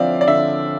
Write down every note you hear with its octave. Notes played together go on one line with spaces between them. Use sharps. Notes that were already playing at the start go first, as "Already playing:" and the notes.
Already playing: D3 F3 C4 D5 E5 F5
D5
D3 E5